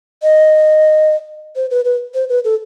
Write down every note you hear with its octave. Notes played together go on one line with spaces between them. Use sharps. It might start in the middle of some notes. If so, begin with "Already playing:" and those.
D#5
C5
B4
B4
C5
B4
A4